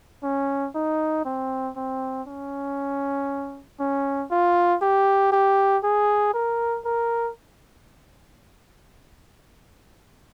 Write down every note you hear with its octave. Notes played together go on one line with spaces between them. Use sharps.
C#4
D#4
C4
C4
C#4
C#4
F4
G4
G4
G#4
A#4
A#4